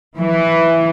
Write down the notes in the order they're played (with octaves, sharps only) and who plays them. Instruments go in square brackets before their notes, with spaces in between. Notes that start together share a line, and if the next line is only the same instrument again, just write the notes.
[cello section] E3